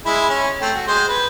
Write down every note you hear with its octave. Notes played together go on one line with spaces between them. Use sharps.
G#3 E4
C#4
A3 C4
F#4
G#3 C5
B4